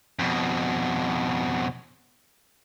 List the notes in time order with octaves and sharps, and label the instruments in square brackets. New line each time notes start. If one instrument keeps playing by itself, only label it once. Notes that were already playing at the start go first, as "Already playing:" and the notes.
[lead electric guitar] F2 B2